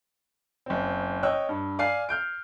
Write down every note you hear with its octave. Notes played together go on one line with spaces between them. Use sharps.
F#1 C4
C#5 D#5 G5 E6 F#6
G2
D5 F5 G#5 C7
F6 G6 D7